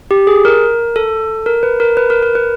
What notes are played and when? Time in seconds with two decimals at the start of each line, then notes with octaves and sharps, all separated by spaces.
0.11 G4
0.27 G#4
0.45 A#4
0.96 A4
1.46 A#4
1.63 B4
1.80 A#4
1.97 B4
2.10 A#4
2.23 A#4
2.35 B4